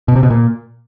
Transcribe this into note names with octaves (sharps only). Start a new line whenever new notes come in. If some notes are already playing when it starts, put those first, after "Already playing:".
B2
C3
B2
A#2